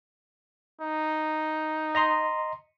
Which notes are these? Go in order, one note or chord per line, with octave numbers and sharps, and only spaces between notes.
D#4
D#5 A#5 C6